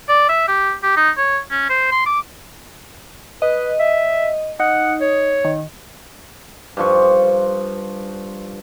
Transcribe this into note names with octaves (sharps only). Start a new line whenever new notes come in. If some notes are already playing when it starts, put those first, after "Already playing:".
D5
E5
G4
G4
D#4
C#5
C#4
C5
C6
D6
B4 D#5
E5
D#4 F#5
C#5
D#3
G2 F3 C#6